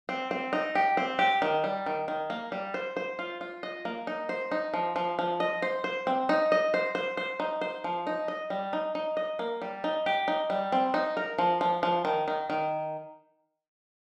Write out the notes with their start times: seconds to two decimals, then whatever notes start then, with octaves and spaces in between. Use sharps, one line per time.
0.09 C4
0.31 C4
0.53 D#4
0.75 G4
0.97 C4
1.19 G4
1.42 D#3
1.64 G3
1.86 D#3
2.08 D#3
2.30 A#3
2.52 G3
2.74 C5
2.97 C5
3.19 F4
3.41 F4
3.63 D#5
3.85 A#3
4.07 D#4
4.29 C5
4.51 D#4
4.74 F3
4.96 F3
5.19 F3
5.40 D#5
5.62 C5
5.84 C5
6.07 C4
6.29 D#4
6.52 D#5
6.74 C5
6.95 C5
7.17 C5
7.40 D#4
7.61 C5
7.84 F3
8.07 D#4
8.28 D#5
8.50 G3
8.73 D#4
8.95 D#4
9.17 D#5
9.39 A#3
9.62 G3
9.84 D#4
10.06 G4
10.28 D#4
10.50 G3
10.72 C4
10.94 D#4
11.17 A#4
11.38 F3
11.61 F3
11.83 F3
12.05 D#3
12.28 D#3
12.50 D#3